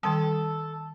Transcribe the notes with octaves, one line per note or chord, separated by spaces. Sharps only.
D#3 G3 A4